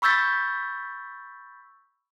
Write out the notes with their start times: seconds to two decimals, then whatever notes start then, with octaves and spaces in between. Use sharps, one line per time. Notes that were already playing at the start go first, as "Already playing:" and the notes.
0.02 B5 C#6 E6 G6 A6 B6